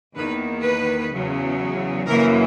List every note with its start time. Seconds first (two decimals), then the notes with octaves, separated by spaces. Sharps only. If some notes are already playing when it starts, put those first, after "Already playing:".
0.16 E2 D#3 A#3 B4
0.63 B4
1.11 E2 C#3 F#3
2.06 F#2 C#3 E3 A#3 A#4